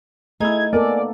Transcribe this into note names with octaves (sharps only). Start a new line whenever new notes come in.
A3 D#4 E4 G#4 G#6
A#3 B3 A4 A#4 D5 G#5